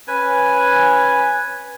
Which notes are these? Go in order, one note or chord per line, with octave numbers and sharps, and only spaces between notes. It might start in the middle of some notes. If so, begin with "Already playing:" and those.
C#4 B4 G#5